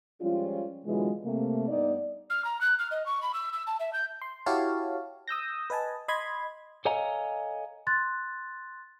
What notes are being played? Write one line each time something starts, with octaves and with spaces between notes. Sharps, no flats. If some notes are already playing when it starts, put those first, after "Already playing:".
F3 G3 G#3 C#4 F4
B2 D3 E3 F#3 G#3 F4
C3 A3 A#3
G2 B3 D#4 D5
F6
A#5
F#6
F6
D#5
C#6
B5
E6
E6
A5
E5
G6
C6
E4 F#4 G4 C#5 F5 A5
D#6 E6 G6 A#6
B4 D#5 G#5 A5
D#5 B5 C6 G#6
A4 C#5 D#5 F5 G#5 A#5
C6 F#6 A6